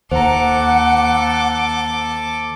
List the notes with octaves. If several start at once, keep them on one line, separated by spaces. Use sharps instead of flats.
D#2 A4 C5 F#5 A#5 D6